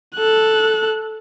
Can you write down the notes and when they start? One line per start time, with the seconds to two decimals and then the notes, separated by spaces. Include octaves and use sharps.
0.16 A4 F#6